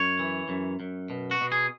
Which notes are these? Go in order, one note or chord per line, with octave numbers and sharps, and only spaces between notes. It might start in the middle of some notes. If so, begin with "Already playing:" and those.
Already playing: F#2 C#5
E3
F#2
F#2
B2
F#4
B2
G#4